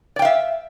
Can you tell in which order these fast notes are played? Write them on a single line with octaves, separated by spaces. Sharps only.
D5 G5 F5 E5